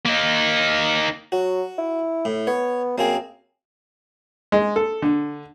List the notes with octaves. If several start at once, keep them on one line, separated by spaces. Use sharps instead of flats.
A#3 D#4
F#3 F#4
E4
A2
B3 C#5
F#2 A#3 C4 G#4
G#3
A4
D3